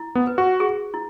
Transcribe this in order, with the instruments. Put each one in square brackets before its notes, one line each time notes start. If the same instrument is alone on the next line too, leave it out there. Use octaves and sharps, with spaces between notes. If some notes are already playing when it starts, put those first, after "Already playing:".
Already playing: [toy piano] E4
[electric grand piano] B3
[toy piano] B4
[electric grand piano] F#4
[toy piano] G#4
E4